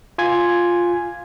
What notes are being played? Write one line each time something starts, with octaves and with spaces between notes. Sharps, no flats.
F4 G#5 G#6